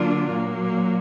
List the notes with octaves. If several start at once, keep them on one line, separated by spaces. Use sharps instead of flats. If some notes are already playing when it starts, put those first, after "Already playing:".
Already playing: D3 F#3 A#3 D4 F4
A#2 F#3 A#3